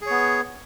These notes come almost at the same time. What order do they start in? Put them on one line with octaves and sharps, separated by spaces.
G#4 C#5 B3